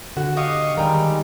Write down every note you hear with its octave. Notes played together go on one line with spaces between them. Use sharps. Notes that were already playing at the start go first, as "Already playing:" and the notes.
D3 F#4
G4 D#5 F5 C#6 D#6
D#3 G3 G#3 G5 A#5